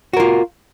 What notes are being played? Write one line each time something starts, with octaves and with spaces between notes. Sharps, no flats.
F4 F#4 A#4